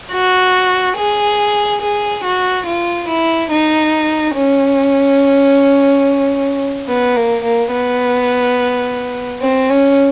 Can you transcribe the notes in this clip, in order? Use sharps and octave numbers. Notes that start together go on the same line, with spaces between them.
F#4
G#4
G#4
F#4
F4
E4
D#4
C#4
B3
A#3
A#3
B3
C4
C#4